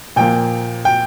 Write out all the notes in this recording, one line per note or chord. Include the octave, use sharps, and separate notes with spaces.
A#2 F3 A#3 G5
G5